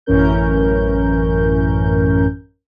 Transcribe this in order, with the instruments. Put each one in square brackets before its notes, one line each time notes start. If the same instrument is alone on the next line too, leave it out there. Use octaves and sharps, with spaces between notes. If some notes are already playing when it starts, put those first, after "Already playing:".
[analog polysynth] A1 F#2 E3 C#4 A#4 G6